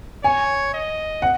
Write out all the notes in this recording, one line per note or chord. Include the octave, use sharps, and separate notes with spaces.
C#5 G#5
D#5
F#5